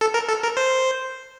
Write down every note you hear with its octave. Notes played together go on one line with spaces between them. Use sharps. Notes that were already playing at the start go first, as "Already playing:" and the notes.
A4
A#4
A4
A#4
C5